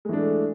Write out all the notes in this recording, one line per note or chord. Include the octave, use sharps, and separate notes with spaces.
E3 G#3 A3 D4